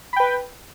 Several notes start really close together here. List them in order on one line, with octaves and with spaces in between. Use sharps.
B5 G5 B4